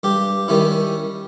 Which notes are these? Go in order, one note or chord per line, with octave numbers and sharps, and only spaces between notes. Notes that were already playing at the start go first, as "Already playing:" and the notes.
G2 G4
D#3 G3 C#4 E4